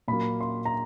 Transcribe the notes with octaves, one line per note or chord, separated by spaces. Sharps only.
A#2 F#3 A#3 B5
C6
A#5